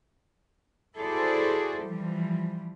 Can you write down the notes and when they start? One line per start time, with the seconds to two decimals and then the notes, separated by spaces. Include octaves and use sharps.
0.97 E4 F#4 G#4 A4 C5 D5
1.85 E3 F3 G3